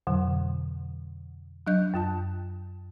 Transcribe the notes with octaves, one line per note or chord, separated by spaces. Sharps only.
F2 B2 D3 F#3
F#3 D4 D#5 F#6 G6
F#2 F4 A5